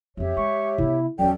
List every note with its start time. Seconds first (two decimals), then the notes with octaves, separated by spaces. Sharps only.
0.17 F2 F3 G4 C#5 E5
0.37 G#3 C#6
0.78 C3 B3 E4
1.19 E2 F3 F#3 C#4 A4 D5 G5